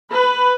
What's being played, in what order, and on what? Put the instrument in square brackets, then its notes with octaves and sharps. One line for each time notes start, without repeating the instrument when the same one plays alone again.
[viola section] B4